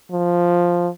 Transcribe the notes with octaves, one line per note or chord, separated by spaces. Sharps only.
F3